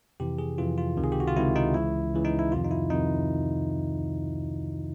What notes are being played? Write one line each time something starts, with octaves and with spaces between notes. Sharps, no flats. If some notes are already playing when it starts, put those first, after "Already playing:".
F2 C3 E3 G4
G#4
F2 C3 E3 F4
F4
C#2 C3 D#3
G#4
G4
F#4
F4
C#2 C3 D#3 E4
D#4
C#2 C#3 E3 E4
C#2 C#3 E3
D#4
E4
F2 C3 D#3 F4
D#4
E4
F2 C3 D#3 D#4